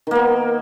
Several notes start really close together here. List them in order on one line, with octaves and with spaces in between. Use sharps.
D#3 A#3 B3